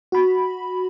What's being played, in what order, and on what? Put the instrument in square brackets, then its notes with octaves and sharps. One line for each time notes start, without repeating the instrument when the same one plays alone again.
[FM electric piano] F#4 B5